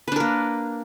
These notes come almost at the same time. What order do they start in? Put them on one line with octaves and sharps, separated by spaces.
B4 D4 A#4 A#3